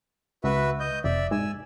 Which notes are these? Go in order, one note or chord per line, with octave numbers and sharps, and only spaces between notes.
C#2 F#4 B4 E5
D#5 G6
F1 D5 E5
G#2 G#5 E6